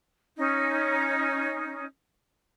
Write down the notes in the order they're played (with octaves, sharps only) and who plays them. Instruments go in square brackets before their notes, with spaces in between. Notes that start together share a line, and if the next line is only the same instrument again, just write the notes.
[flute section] C#4 D#4